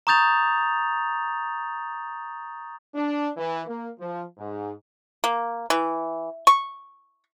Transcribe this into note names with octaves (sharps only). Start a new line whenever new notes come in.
A#5 C#6 D#6 G6 A6 F7
D4
E3
A#3
F3
G#2
A#3
E3
C#6